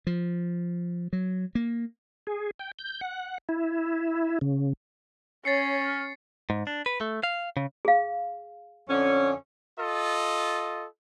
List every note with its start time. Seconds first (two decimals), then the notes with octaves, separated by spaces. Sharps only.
0.07 F3
1.13 F#3
1.55 A#3
2.27 G#4
2.60 G5
2.79 G6
3.01 F#5
3.49 E4
4.41 C#3
5.45 C#4 C#5 A6 C7 C#7
5.81 F6
6.50 G#2
6.67 D4
6.86 B4
7.01 A3
7.23 F5
7.57 C#3
7.85 G#4 F5
8.89 F2 D3 C#4
9.78 F4 A4 D#5